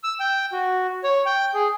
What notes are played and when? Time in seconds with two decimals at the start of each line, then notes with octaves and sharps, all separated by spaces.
0.04 E6
0.20 G5
0.52 F#4
1.04 C#5
1.26 G5
1.54 G#4